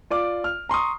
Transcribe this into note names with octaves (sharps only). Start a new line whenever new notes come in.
F4 D5 D6
F6
A#5 C6 C#6 D#6